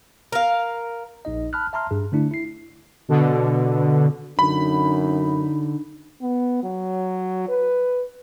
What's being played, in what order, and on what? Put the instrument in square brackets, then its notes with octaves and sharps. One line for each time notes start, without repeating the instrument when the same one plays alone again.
[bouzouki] A#4 F5
[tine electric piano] A#1 D#4 D#5
A5 B5 F6 F#6
E5 A5 A#5 C6 F6
G2 G#4
D3 A3 D4 E4
E4 C7
[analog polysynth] B2 D3
[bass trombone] F#2 [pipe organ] D3 [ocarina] D#4 [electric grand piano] B5
[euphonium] B3
F#3
B4